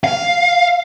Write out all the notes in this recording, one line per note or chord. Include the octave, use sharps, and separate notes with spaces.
F5